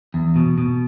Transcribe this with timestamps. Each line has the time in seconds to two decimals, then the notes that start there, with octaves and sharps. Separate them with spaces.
0.14 E2
0.36 B2
0.58 B2